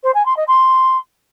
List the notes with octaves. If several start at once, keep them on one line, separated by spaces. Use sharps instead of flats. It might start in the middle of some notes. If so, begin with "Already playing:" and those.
C5
G#5
C6
D#5
C6